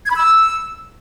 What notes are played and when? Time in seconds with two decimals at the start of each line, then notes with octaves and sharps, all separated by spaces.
0.05 G#6
0.10 B5
0.15 E6